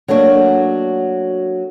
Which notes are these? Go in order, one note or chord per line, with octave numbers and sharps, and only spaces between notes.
F#3 A3 A#3 D4 F#4